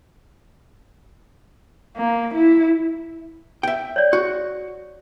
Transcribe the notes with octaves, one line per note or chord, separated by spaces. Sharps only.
A#3
E4
E5 G5
C#5 D5
F#4